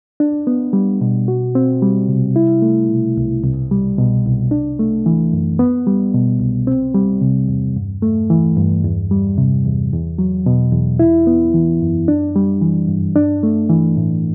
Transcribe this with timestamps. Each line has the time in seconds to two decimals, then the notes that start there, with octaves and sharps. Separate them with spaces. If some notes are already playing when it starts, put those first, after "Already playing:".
0.20 D4
0.47 B3
0.73 G3
1.01 B2
1.28 F#4
1.55 C4
1.82 G3
2.09 C3
2.36 E4
2.62 A3
2.89 B2
3.17 C2
3.44 C2
3.71 G3
3.98 B2
4.25 C2
4.51 D4
4.79 A3
5.06 E3
5.33 F#2
5.59 B3
5.87 G3
6.14 B2
6.40 C2
6.67 C4
6.94 G3
7.21 C3
7.48 E2
7.76 G2
8.02 A3
8.30 E3
8.57 G2
8.85 E2
9.11 G3
9.38 C3
9.65 E2
9.93 E2
10.18 F#3
10.46 B2
10.72 E2
10.99 E4
11.27 B3
11.54 E3
11.82 F#2
12.08 D4
12.36 G3
12.61 E3
12.89 G2
13.16 D4
13.43 A3
13.70 E3
13.97 A2